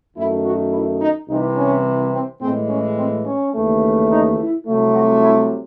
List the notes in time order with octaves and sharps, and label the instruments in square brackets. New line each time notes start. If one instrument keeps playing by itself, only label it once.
[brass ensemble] F#2 D#3 A3 E4
F#4
E4
D#4
C2 C3 E3 D#4
C#4
C4
A2 E3 G#3 C4
C#4
C4
C#4
D#2 C#3 E3 A3
D#4
E4
C2 C3 F#3 A3
F#4
E4